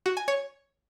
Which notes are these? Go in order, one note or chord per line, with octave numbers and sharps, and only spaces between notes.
F#4
G#5
C#5